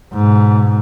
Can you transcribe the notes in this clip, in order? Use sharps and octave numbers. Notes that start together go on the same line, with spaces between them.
G#2 B2